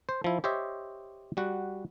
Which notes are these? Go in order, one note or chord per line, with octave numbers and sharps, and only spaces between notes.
C5
F3 E4
G4 C5 C#5 D#5 E5
G3 F#4 F#5